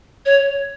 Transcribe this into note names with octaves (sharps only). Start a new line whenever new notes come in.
C#5